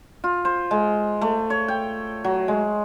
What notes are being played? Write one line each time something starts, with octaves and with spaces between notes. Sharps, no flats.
F4
C5
G#3
A3
C#5
G5
F#3
G#3